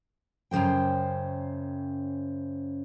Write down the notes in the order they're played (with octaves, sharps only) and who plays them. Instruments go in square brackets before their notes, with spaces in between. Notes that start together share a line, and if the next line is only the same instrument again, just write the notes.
[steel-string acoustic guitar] F#2 C#3 G#3 C5 G5